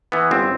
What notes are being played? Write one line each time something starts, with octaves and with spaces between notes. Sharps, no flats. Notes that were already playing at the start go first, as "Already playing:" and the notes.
E3 B3
G1 C4